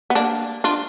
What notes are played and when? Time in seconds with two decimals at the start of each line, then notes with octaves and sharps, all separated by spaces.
0.10 B3
0.15 A#3 D4
0.64 D4 F4